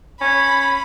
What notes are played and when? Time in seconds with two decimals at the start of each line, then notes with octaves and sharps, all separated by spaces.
0.21 C#4 B5